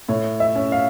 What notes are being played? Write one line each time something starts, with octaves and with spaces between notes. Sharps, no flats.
A2 C#5
E5
C#4
F5